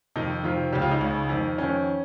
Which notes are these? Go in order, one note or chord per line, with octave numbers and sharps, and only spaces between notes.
F2 C3 D#3 D#4
F2 C3 D#3 F4
C#2 C#3 G4
F4
D#4
C#2 C#3
F2 D#3
F2 D#3 C#4